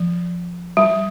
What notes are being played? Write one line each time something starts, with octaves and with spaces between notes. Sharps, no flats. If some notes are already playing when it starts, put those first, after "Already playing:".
Already playing: F3
G3